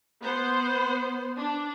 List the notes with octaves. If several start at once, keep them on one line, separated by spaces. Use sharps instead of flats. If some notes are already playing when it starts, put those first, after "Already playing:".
B3 C5
D4